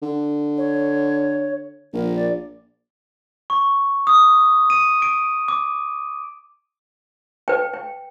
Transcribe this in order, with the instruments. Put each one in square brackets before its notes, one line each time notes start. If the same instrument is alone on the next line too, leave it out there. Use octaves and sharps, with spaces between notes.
[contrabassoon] D3
[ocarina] C#5
[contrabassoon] A#1 [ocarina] A#4
[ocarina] D5
[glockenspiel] C#6
D#6
D#7
D7
D6
[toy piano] B4 G5
G5